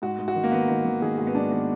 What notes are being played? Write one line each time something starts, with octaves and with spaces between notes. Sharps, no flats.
G#2 F#4
G#2
F#4
D#3
A#3
D#3 B3
D#3 B3
D#3
D#3 G#4
G#2 F#4
B3
G#2 D4
D#3 B3